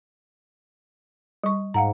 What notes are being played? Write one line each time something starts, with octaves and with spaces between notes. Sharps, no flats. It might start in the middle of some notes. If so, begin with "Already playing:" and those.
G3 C#6
G#2 F5 F#5 A#5